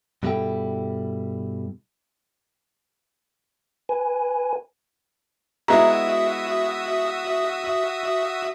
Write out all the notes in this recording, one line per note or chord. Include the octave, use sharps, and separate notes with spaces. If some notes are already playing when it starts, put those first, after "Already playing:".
G2 B2 G3 E4 A4 G5
B4 G#5
G#3 B3 E4 F#4 E5 A#5 D#6